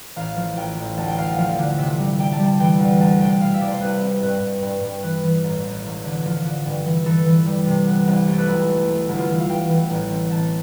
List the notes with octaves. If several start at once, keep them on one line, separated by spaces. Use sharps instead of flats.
A1 F5
F3
A1 G5
A1
D2 A5
G5
D2 F5
F3 F5
D3
C3 E5
G3
G3 G5
A5
G3
A5
E3 G5
D2
D2 A5
C3 G5
B2 F5
E5
C2 D5
C5
C2 B4
C4
G2 B4
G2
G2
G2
E3 B4
E3
A1
A1
E1
D3
F3
D3
G2
E3
E3 A4
E3
G3
C3
B3
C2
A3 G4 A4
B4
B1 E4
E4
A3
A3
G1 E4
F4
E3
F5
G1 G5
E3
A1
C4
A1 A5